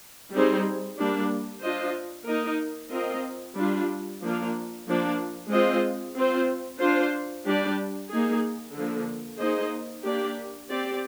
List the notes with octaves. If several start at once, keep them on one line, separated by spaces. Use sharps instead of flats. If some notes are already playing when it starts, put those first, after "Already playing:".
G3 C4 D#4 G#4 C5
G3 A#3 D4
D4 F4 C5 D#5
A#3 D#4 A#4 D#5
C4 F4 A#4 D#5
G3 D4 F4
F3 A#3 D4 F4 A#4
F3 A#3 D4
G#3 C4 F4 C5 D#5
C4 F4 C5
D4 F4 C5
G3 D4 G4 D5
A#3 D#4 G#4
D3 F3 A#3
A#3 D#4 G#4 C5 D#5
A#3 D4 G4 D5
C4 G4 D5